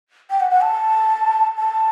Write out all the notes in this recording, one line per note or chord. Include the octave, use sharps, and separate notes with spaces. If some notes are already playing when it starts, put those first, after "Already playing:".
G5
F#5
F#5
A5
A5